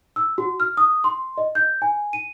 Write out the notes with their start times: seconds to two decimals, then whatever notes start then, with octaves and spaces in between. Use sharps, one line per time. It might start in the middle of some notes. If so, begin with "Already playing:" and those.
0.16 E6
0.38 F#4
0.60 F6
0.77 D#6
1.04 C6
1.38 D#5
1.55 G6
1.82 G#5
2.13 D#7